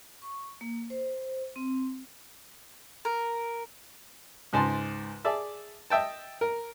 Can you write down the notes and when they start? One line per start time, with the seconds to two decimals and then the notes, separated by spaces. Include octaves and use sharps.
0.22 C#6
0.61 A#3
0.90 C5
1.56 C4
3.05 A#4
4.53 C#2 G#2 A5 C6
5.25 G#4 D5 E5 A5
5.90 D#5 E5 G5 A5
6.41 A#4